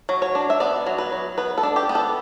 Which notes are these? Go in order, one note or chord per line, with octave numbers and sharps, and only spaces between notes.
F#3
C#5
D4
E5
B3 D5
F#3
B4
F#3
B3 B4
A4
D4
G4
B3
A4